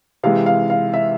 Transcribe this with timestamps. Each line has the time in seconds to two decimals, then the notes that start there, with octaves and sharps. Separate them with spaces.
0.23 C3 E3 G#3 F5
0.46 F5
0.70 F5
0.94 E5